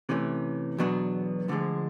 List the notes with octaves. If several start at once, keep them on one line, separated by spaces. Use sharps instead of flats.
C3 E3 A3 C#4
E2 B2 F#3 B3 D4
D2 D3 F3 G#3